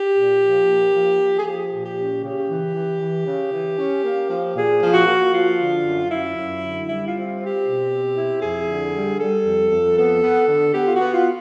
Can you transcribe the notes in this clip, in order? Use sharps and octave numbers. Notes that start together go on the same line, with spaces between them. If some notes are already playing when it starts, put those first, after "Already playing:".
Already playing: G4
A#2
F3
A#3
F3
F3
G#4
F3 G4
A#2
G4
C#4
C#3 G4
E3
E3
E3
C#3
E3
C#4
A#3
F3
A#2 G#4
F3
F#4
A#3
F3 F4
D3
F#2
F#2 E4
F#2
D3
G3 E4
F4
C4
F4
C4
G4
B2
C4
E4
F2 G#4
D3
G3
G3 A4
F2
F2
B3 A4
B3
D3
B3 G4
F4
F#4
B3
F4